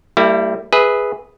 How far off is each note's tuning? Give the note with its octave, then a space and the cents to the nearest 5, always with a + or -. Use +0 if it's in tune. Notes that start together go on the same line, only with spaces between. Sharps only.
G3 -5 A#3 -45 E4 +0
G#4 +0 B4 +0 E5 -20